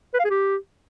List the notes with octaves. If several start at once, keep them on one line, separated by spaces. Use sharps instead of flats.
B4
F5
G#4
G4